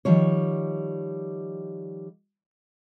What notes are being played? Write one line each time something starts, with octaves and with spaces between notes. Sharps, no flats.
D#3 F3 G3 C#5